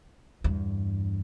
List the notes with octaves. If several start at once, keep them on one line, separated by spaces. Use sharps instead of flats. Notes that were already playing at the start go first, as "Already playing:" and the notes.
E2 G2